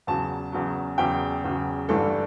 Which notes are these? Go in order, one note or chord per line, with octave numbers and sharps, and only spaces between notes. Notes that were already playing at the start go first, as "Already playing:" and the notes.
E2 C#3 F#3 A5
E2 C#3 F#3
E2 C#3 F#3 G5
E2 C#3 F#3
G1 G2 E3 G3 A4